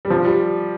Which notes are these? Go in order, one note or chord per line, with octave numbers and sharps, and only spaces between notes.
G3
F3
G3